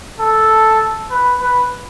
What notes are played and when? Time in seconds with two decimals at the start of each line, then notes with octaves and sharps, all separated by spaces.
0.20 A4
1.11 B4
1.40 B4